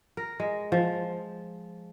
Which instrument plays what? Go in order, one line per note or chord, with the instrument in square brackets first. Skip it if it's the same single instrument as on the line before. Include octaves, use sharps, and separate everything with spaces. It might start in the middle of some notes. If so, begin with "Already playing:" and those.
[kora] A#4
G#3
F3